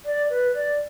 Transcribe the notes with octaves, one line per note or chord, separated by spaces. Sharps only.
D5
B4
D5